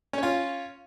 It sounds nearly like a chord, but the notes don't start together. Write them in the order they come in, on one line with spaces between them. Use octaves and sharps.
C#4 C#5 F4